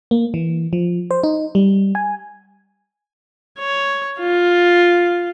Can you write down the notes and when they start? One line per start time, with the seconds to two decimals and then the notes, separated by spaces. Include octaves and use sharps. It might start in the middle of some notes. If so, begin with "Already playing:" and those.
0.11 A#3
0.34 E3
0.73 F3
1.11 C5
1.23 D#4
1.55 G3
1.95 G#5
3.59 C#5
4.20 F4